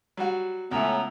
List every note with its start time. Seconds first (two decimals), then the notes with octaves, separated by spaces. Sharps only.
0.17 F#3 G3 F#4
0.71 C#2 A3 B3 C#4 E4 A#5